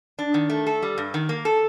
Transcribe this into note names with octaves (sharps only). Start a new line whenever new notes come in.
D4
D#3
A3
A4
G3
G2
D#3
A#3
A4